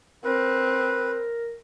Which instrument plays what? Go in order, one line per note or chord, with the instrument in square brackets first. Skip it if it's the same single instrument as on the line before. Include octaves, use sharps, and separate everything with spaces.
[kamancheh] C4 [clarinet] A#4 [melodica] B4